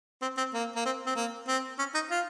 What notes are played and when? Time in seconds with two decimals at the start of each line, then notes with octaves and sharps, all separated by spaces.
0.22 C4
0.37 C4
0.54 A#3
0.76 A#3
0.85 C4
1.06 C4
1.16 A#3
1.48 C4
1.79 C#4
1.94 D#4
2.10 F4